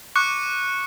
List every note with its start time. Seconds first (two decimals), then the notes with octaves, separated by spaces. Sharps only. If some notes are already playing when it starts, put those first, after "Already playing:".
0.16 C#6 D6 F#6 C#7